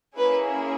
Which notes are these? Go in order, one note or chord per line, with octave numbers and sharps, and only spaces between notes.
A#3 C#4 E4 G#4 B4